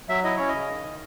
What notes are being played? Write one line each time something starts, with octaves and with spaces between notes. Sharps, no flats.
F#3 E5
E4 D#5
C#4 C#5
D#5
C#3
D#3